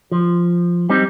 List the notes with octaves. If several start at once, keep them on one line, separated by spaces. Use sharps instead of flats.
F3
G3 C4 D#4